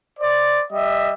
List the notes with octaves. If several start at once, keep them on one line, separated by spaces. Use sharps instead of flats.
C5 D5
G3 D#5 E5